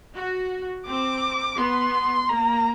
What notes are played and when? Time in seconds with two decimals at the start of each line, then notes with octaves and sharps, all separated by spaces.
0.17 F#4
0.87 C4 D6
1.58 B3 C6
2.29 A#3 A#5